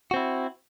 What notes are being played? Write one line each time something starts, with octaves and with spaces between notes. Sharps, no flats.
C4 E4 F#4